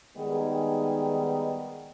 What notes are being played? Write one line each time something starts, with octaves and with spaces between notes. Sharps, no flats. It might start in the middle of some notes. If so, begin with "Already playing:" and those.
D#3 G3 G#3 B3 D#4 G#4